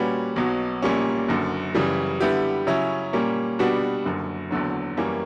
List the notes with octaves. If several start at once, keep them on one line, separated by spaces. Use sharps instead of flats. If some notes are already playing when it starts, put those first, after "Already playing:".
Already playing: A#2 G3 C#4 F#4 B4
B1 B2 F#3
A#1 A#2 G3 A#3 C#4
F#1 F#2 D3
F#2 C#3 E3 G3
D3 G3 B3 E4 G4
C#3 F#3 C#4 E4
A#2 G3 A#3 C#4
B2 G3 B3 D4 F#4
F#1 F#2 D3
F#1 E2 D3 F#3
F#2 E3 G3 A#3 C#4